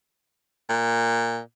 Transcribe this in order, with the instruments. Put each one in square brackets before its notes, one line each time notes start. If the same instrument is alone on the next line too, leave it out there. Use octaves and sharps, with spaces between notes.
[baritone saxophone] A#2